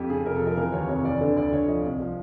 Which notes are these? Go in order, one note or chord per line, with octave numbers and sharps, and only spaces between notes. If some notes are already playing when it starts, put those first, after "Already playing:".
Already playing: F2 G4
C#3 G#4
F1 A#4
A4
F3
A#4
E3 A#4
D#2 C#5
F1 C#5
E3 D5
D3 D5
D2 D5
D2 C#5
F3 D#5
C2
F3